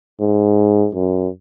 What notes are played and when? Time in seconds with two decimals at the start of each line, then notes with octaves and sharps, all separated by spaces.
0.20 G#2
0.95 F#2